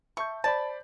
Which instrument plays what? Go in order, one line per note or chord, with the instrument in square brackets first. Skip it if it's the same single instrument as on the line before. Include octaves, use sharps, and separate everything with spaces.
[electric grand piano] E5 A5 G6 [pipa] C#6
[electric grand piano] C5 D5 B5 [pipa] A5